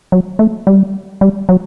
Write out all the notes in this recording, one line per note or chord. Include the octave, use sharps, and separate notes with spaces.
F#3
A3
G3
G3
F#3